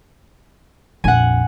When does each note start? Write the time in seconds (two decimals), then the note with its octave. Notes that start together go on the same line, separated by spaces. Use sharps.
1.04 A#1 F2 F#5 G#5